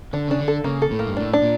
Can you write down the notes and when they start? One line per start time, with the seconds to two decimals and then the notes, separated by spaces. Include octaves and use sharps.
0.13 D3 D4
0.27 C#3 D4
0.39 D3
0.48 A4
0.64 C#3 A#3
0.82 A4
0.91 A2
0.99 A#3
1.07 G2
1.16 A2 D4
1.33 D4
1.42 A#2